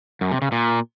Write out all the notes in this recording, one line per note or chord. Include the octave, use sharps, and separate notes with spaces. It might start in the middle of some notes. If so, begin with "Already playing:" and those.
F#2
C3
C#3
A#2